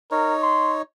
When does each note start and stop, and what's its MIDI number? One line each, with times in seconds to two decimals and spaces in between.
0.11 0.82 63
0.11 0.34 70
0.11 0.82 73
0.42 0.74 84